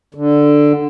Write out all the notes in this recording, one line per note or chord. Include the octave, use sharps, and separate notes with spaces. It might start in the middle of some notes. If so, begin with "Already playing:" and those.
D3